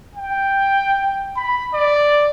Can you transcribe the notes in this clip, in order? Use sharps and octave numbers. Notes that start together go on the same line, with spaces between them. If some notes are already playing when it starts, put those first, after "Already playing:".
G5
B5
D5